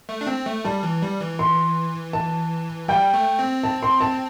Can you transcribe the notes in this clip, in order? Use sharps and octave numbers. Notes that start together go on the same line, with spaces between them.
A3
D4
C4
A3
G3 A5
E3
G3
E3
C6
A5
G3 G5
A3
C4
A5
C6
A5